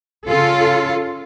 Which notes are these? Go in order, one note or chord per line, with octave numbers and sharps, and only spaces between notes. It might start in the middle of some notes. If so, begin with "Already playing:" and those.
C#3 F4 A4